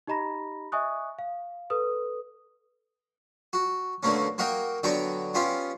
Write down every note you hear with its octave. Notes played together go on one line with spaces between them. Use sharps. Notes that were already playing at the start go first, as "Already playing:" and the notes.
D#4 G4 D#5 A#5 B5 A#6
D#5 E5 G#5 C#6 D#6 F#6
F5
A4 B4 D#6
F#4
B2 D3 A3 A#3 C#4
A#3 F#4 A#4 D#5 G5
D3 F#3 B3 G5 A#5 C#6
B3 C#4 F4 G4